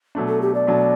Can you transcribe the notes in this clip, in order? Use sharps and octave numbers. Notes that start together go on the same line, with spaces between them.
B2 F#3 A3 D4
A4
G4
D5
B2 F#3 A3 D4